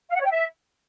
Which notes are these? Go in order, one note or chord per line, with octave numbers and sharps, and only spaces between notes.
F5
F#5
C#5
G5
E5